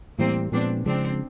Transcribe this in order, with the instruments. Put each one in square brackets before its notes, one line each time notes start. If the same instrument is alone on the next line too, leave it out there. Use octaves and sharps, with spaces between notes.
[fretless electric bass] A2 E3 G3 [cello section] A#3 C4
[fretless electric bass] A#2 F3 G#3 B3 [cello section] C4 D4
[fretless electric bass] C#3 F3 G#3 [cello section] C4 D4